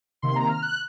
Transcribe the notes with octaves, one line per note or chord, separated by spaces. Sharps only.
C3 D#3 A#3 C6
A#5
F6
F#6